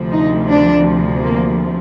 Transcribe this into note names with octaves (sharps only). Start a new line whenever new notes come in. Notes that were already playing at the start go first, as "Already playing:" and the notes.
Already playing: D2 C3 F3
D#4
D4
A#3